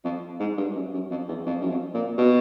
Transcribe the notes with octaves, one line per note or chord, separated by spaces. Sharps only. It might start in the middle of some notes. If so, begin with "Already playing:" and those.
F2
G#2
G2
F#2
F#2
F2
E2
F2
F#2
F2
A#2
B2